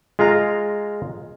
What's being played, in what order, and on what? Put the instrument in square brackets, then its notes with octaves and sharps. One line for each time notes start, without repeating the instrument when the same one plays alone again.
[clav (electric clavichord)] G#3 F4 F5 A#5